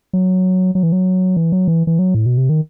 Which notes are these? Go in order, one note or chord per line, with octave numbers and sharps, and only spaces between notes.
F#3
F#3
E3
F#3
E3
F#3
E3
E3
F#3
A2
B2
C3
D#3